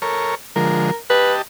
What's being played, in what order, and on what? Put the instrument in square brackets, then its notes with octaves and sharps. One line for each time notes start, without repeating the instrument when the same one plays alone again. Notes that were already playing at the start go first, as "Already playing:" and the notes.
[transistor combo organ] A4 A#4 C#5
[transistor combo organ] D3 F3 G#3 [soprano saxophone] A#4
[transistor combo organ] G4 D#5 A5 [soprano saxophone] B4